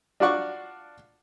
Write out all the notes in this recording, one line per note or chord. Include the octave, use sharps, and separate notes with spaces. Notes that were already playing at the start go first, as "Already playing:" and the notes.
D4 F4 F#4 D5 F#5 C#6